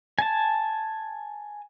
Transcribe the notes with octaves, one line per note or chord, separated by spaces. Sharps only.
G#5 A5